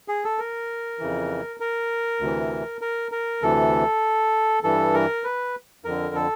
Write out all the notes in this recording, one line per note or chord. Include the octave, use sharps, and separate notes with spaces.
G#4
A4
A#4
F2 C#3 E3
A#4
D2 C3 E3
A#4
A#4
D2 C3 E3 A4
G2 E3 A4
A#4
B4
F2 D3 A#4
A4